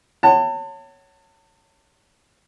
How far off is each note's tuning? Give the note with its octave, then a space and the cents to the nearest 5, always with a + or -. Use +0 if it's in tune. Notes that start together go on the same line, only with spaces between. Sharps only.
C#5 +0 F#5 +35 A5 +35